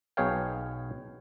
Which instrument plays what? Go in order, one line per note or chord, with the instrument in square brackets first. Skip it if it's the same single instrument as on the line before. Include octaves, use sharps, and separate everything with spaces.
[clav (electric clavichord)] B1 B2 G#4 C#5 F5 G5